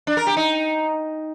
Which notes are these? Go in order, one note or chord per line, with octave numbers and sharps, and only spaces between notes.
D4
A#4
G4
D#4